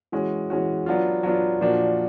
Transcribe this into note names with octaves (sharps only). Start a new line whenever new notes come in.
E3 G#3 C#4 F#4
E3 G#3 C#4 F#4
F#3 B3 D4 F4
F#3 B3 D4 F4
A#2 F3 A#3 D4 F#4